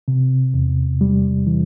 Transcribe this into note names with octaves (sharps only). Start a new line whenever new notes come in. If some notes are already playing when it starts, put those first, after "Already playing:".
C3
E2
G3
E3